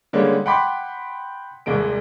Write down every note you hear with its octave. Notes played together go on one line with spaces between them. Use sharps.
D3 G3 G#3 A#3 C#4
F#5 G5 B5 C6 D6 B6
D#1 C2 G#3 D7